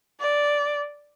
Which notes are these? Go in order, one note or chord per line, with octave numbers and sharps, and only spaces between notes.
D5